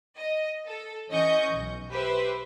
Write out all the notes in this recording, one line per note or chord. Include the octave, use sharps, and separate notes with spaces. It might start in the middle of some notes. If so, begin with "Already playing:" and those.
D#5
A4
E3 C#4 D#5 C#6 G6 C#7
B1
G4 B4 C5 E5